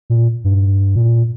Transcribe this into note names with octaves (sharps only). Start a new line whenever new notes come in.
A#2
G2
A#2